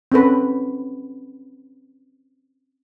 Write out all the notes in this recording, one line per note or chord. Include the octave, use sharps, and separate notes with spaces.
C4 C#4 A4 B4